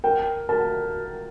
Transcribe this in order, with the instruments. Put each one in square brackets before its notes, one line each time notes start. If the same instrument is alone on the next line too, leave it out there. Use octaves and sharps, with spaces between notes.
[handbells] A#4 [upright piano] G5
[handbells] A#4 [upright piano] A5